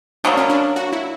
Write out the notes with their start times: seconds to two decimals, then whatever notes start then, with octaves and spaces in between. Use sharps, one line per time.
0.24 B2 F#3 A#3 D4
0.37 C#4
0.50 D4
0.76 F#4
0.92 E4